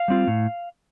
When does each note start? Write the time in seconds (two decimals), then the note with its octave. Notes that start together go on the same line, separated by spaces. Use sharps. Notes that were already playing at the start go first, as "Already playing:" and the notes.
Already playing: F5
0.08 G3 C4 F4
0.28 A2